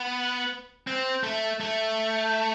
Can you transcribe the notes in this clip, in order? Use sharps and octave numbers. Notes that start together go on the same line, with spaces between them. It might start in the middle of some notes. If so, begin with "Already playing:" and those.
Already playing: B3
C4
A3
A3